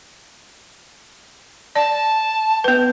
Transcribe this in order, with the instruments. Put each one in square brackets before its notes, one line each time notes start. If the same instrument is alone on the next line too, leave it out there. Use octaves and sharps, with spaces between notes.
[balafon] D5 [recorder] A5
[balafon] B3 B4